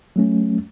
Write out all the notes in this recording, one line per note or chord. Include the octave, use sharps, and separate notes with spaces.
F#3 A3 C#4